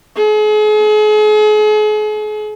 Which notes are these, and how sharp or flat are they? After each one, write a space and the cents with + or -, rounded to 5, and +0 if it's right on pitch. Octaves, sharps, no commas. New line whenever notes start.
G#4 +40